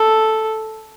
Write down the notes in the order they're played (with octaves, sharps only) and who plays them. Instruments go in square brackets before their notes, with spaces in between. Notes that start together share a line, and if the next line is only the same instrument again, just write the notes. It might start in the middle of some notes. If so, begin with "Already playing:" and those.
Already playing: [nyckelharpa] A4